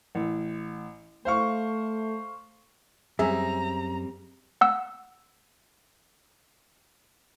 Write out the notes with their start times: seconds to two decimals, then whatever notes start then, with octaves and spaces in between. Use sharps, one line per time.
0.15 A1
1.25 A3 C5 F5 C#6
3.19 F#2 G3 C4 G#4 E5 A#5
4.61 F#5 E6